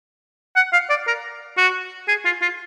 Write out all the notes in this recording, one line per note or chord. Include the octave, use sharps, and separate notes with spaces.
F#5
F5
D5
A#4
F#4
G#4
F4
F4